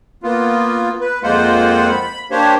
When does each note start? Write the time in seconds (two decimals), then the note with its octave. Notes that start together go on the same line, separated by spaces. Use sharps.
0.23 A#3 B3 F4
1.01 B4
1.23 F2 G#3 A#3 F4 C5 F#5
1.89 B5
2.31 A#3 D4 G4 C5 C#5